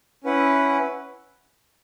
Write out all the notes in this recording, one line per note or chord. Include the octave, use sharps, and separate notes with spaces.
C#4 E4 B4 F#5